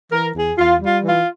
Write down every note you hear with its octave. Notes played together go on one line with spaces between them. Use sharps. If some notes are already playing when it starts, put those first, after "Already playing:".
E3 A#4
E2 G#4
E2 F4
G3 F4
E3 F4